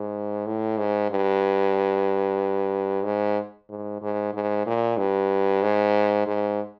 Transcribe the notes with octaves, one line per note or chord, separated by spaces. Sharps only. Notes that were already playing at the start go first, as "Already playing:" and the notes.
Already playing: G#2
A2
G#2
G2
G#2
G#2
G#2
G#2
A#2
G2
G#2
G#2